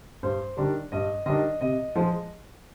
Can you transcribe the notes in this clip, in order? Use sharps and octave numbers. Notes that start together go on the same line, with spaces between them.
G2 C5
D#3 G3 D4
G2 D#5
D#3 G3 D4 D#5
C3 D#5
F3 G#3